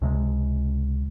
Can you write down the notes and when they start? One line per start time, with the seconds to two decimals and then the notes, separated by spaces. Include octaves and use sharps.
0.02 C#2 C3 G#3